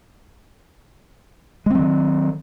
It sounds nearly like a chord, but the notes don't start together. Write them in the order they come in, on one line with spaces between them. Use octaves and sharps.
G#3 C4 F#3 D#3